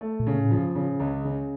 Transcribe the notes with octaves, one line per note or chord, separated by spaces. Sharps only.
A3
A#2
C#3
A2
F3
C#3
C#2
C#3